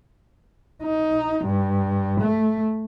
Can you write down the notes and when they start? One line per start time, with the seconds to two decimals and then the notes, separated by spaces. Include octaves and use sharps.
0.83 D#4
1.44 G2
2.21 A3